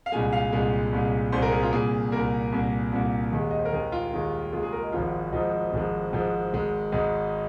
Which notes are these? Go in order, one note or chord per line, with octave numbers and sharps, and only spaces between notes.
F5
C2 A#2 G#3 G#5
F5
C2 A#2 G#3
C2 A#2 G#3
C2 A#2 G#3 C5
A#4
G#4
F4
C2 A#2 A#3 G#4
C2 A#2 A#3 A#4
C2 A#2 A#3
C2 A#2 A#3
D#2 D#3 G#3
D#5
C5
A#4
D#2 D#3 G#3 G#4
F4
D#2 D#3 G#3
D#2 D#3 G#3 F4
G#4
A#4
D#5
G#1 G#2 F3 G#3 F4
G#1 G#2 F3 G#3 D#4
G#1 G#2 F3 G#3
G#1 G#2 F3 G#3
G#1 G#2 G#3
G#1 G#2 G#3 D#4